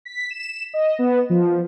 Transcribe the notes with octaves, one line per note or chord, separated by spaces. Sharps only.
B6
E7
D#5
B3
F3